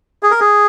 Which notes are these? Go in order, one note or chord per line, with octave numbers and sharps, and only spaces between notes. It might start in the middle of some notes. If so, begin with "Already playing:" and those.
G#4
A#4
G#4